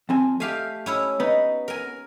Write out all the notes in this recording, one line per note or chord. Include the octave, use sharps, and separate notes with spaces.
F2 C4 G#5
A3 G4 F5 G#5
C#4 E4 C#5
B3 D#4
A#4 G#5